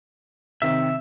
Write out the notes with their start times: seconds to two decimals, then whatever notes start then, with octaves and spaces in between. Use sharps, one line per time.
0.62 C3 D#3 C4 E5